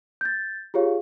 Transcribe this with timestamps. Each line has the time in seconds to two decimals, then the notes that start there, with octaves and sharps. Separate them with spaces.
0.21 G6 A6
0.74 F4 G4 G#4 C#5 F5